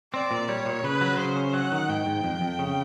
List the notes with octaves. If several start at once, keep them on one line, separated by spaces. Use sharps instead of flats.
C4 D5
A#2
G3 C#5
A#2
C#3 B4
F#3
C#3 C5
C#4
F#3 F#5
D#3
G#2 G5
G#2
F2
F2
C#3